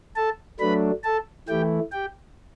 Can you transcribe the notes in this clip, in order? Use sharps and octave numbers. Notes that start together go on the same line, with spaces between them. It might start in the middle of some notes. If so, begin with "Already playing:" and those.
A4 A5
F#3 A3 D4 B4 B5
A4 A5
E3 A3 E4 G4 G5
G4 G5